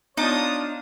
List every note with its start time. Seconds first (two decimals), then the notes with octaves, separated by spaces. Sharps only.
0.17 B3 D4 D#4 F4 C#5 D#5 A5 D#6